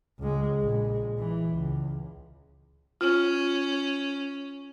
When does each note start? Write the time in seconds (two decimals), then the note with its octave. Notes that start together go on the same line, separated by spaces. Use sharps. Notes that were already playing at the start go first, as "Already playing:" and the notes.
0.20 C#2 G#3
0.60 A#1 G#3
1.18 E3
1.51 C#2
3.01 C#4 F4